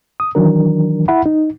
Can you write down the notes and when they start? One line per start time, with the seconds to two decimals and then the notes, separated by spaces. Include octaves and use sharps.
0.20 D#6
0.35 D#3 E3 F#3 D4 A#4
1.08 E4 E5 F#5 B5
1.26 D#4